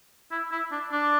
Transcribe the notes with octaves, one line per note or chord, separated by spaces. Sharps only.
E4
E4
D4
D4